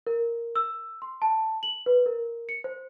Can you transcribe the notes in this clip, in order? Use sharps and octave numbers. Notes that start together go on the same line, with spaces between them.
A#4
E6
C6
A5
F#7
B4
A#4
C#7
C5